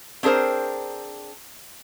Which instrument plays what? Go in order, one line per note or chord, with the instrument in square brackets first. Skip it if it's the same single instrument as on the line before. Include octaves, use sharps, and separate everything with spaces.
[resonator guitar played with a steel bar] C4 D4 G#4 A#4 C5